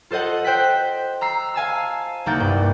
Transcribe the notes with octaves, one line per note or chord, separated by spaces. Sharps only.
F4 A4 C5 D#5 F#5
C5 G5 F#6 B6
A#5 E6 C7
F5 G#5 A5 E6
C2 A#3 D#4 F#5 G6 A6
G2